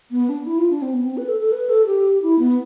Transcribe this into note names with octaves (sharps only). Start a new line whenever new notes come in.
B3
D4
E4
F4
D4
C4
B3
C4
B4
A4
A4
B4
A4
G4
E4
B3